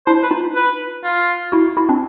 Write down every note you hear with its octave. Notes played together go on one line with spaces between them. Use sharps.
D4 E4 C5
B4
D#4 F4
B4
F4
E4 F#4
E4 F#4
C4 D4